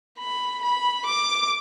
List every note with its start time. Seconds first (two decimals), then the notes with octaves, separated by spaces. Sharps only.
0.19 B5
0.63 B5
1.06 D6